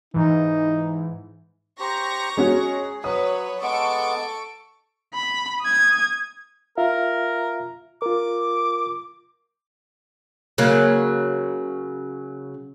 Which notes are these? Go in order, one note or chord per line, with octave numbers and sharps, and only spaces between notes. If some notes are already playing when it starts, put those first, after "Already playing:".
G#2 E3 D#4
G4 C5 A#5 C#6 A#6
G#3 C#4 F#4 G#4
F#3 B4 C#5 D#6
G#3 B3 A4 C#6 D6 D7
B5
D#6 G#6
F4 A#4 E5 F5
F4 A#4 D6
C#3 F#3 A#3